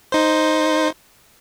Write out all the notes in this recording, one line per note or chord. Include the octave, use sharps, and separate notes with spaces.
D#4 C5